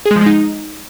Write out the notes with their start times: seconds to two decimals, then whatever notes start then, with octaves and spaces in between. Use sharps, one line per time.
0.06 G#4
0.11 G#3
0.16 F3
0.21 G#3
0.26 D#4